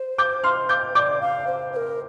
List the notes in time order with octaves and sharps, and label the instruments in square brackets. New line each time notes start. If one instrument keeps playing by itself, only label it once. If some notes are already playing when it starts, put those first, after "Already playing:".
Already playing: [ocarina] C5
[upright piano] D6 G6
C6 F6
D6 G6
[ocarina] D5 [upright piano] D6 G6
[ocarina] F5
C5
C5
A#4